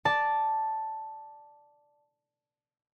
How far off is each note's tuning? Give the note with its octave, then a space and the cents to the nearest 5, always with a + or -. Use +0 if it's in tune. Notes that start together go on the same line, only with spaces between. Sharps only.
D5 +0 A5 +0